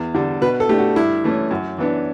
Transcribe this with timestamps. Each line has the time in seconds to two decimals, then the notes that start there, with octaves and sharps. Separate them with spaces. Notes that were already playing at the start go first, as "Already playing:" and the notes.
Already playing: E2
0.14 D3 G3 D4
0.41 B2 B4
0.60 A4
0.69 A3 D4 G4
0.78 F#4
0.96 G2 E4
1.24 E3 A3 C#4
1.51 F#2
1.78 E3 B3 D4